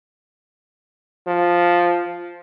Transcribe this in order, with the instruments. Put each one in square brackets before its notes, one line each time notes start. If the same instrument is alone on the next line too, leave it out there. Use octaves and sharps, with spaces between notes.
[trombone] F3